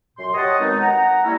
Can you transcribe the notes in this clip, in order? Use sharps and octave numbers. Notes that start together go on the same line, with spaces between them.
F#2 A#2 C6
G4 C#5 D#5 F#5 A5 D#6
B2 D#3 G#3 C4 D#4
F#5 A#5
G3 A#3 C#4 E4